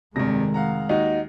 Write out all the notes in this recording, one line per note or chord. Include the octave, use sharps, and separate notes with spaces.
F1 G2 C3 D#3 G#3 A#6
F5 F#5 A#5
D#2 D#4 F#4 D#5